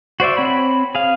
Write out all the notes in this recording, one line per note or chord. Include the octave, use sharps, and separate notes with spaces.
F#4 C5 D5 E5
C4 C#5 B5
G#4 F5